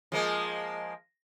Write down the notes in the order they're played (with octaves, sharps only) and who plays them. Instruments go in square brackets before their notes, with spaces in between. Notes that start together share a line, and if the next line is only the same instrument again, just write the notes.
[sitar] F3 G#3 A#3